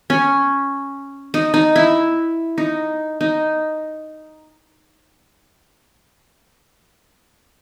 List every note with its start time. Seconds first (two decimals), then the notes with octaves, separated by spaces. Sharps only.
0.10 C#4
1.34 D#4
1.54 D#4
1.76 E4
2.58 D#4
3.21 D#4